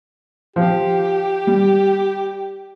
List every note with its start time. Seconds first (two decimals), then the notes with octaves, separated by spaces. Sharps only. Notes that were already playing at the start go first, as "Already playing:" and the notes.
0.56 F3 G4
1.47 G3